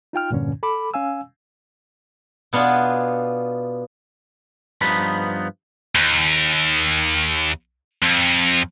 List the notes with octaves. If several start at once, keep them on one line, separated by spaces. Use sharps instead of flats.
D#4 F4 G5 F6
E2 G2 A#2 D3 C#4
A4 B5 D6
C#4 F5 G#5 E6
B2 B3 D4 F4 G#4
G2 F3 B3 D#4 B5
D#2
F2